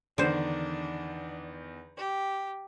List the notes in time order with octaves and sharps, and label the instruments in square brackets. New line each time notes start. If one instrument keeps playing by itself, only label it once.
[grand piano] E2 D#3 [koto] D3 C5 [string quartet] D4
[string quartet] G4